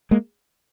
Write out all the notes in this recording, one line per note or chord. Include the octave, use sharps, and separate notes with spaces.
G#3 A#3